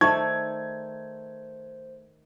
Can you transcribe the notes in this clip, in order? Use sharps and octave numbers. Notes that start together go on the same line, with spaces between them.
D#3 A3 D#4 C5 D5 C#6 G#6